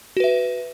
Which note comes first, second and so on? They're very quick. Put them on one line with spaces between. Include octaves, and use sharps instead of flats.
F#4 B4 E5